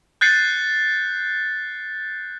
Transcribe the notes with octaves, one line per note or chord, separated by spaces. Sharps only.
F#6 G6 A6 C7 C#7